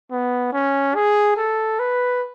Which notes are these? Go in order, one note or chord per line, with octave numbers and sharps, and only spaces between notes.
B3
C#4
G#4
A4
B4